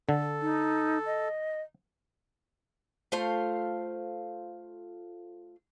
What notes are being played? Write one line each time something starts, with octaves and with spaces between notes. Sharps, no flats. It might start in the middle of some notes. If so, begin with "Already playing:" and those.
D3 A4
D#4
D#5
A3 F4 C5 F5